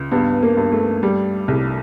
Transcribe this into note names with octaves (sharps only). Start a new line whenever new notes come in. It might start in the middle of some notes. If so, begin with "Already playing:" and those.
Already playing: C#2
G2 B3
A#3
G2
A3
G3
C2